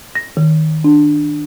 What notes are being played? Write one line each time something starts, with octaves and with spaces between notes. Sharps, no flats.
A#6
D#3
D4